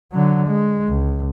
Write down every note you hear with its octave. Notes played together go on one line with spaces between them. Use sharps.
D3 F#3
G#3
C#2